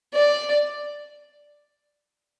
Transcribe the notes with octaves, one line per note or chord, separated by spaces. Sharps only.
D5